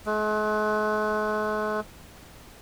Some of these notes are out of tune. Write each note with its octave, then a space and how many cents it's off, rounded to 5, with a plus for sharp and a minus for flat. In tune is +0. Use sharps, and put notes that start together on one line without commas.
G#3 +45